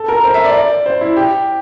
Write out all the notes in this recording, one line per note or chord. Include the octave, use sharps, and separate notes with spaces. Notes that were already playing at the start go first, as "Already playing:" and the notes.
Already playing: A4
A#4
C5
E5
D5
D5
C5
E4
G4